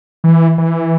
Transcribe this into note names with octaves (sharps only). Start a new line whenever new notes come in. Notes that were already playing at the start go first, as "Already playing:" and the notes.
E3
E3